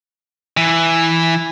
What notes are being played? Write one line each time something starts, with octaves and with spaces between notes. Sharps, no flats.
E3